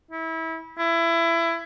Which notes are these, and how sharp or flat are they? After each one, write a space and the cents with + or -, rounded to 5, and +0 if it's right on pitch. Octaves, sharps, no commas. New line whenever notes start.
E4 -25
E4 +20